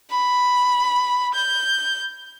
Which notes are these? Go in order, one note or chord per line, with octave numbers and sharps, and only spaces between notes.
B5
G6